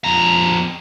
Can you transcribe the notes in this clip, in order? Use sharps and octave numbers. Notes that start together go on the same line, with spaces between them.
F2 A#5